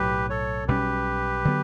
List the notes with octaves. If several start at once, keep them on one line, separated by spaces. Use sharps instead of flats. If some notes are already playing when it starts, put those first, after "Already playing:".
Already playing: B1 A2 F#3 G4 B4
A4 C#5
B1 B2 G3 C#4 G4 B4
D3 F#3 B3